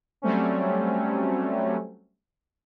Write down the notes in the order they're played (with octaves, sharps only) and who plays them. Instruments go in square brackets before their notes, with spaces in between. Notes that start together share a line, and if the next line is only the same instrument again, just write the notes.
[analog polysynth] F#3 G3 A3 C4 C#4